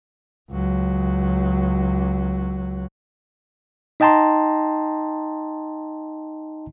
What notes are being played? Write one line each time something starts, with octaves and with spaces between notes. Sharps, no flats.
C#2 F#3
D#4 D#5 G5 A5 A#5 C6